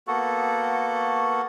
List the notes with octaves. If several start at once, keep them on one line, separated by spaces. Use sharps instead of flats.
A#3 B3 F#4 A4